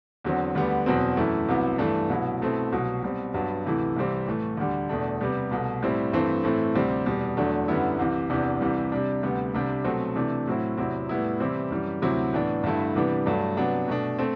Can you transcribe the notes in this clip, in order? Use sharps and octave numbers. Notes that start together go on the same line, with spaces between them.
E2 D3 F#3 C4
D2 D3 G3 B3
E2 B2 F#3 C4
F#2 E3 A3 E4
C2 C3 F#3 B3 E4
G2 E3 A3 D4
C2 B2 F#3 B3 E4
B2 A3 C4 E4
C2 B2 F#3
B2 G3 C4
G2 F#3 B3 D4
D2 C3 E3 A3 E4
C2 C3 E3 G3 C4
A2 E3 A3
D2 D3 G3
E2 B2 A3 D4
C3 G3 B3
C2 B2 A3
A2 G3 C4 E4
G2 E3 A3 C4
A2 E3 A3 C4 E4
D2 C3 G3 C4
E2 B2 G3
E2 D3 F#3 A3 D4
F#2 D3 G3 B3 E4
C2 C3 E3
E2 C3 E3 B3 D4
C2 C3 E3 G3
C3 G3 D4
D2 C3 G3 B3
C2 C3 G3 D4
B2 F#3 A3 C4
C3 E3 A3 D4
A2 F#3 C4 E4
E2 C3 F#3 C4 E4
A2 G3 B3 E4
C3 E3 G3 C4 E4
F#2 E3 G3
D2 C3 F#3 C4 E4
A2 E3 B3 D4
G2 D3 A3 E4
C3 E3 G3 B3 D4
G2 F#3 A3 D4
C3 F#3 B3 D4
B2 A3 D4
A3 C4